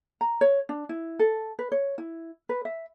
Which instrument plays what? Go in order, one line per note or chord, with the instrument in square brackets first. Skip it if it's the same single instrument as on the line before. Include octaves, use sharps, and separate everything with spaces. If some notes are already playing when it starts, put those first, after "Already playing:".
[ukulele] A#5
C#5
D4
E4
A4
B4
C#5
E4
B4
E5